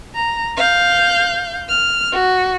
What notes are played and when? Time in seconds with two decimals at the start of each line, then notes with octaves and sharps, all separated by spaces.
0.15 A#5
0.57 F5 G6
1.69 F6
2.12 F#4